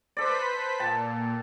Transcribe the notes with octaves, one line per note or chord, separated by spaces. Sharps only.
A4 B4 C5 D5 B6
A#2 G5 A5